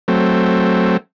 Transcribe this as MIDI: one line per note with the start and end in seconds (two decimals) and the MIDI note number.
0.08 0.97 54
0.08 0.97 57
0.08 0.97 60